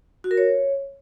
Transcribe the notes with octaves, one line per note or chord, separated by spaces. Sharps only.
F#4
A#4
C#5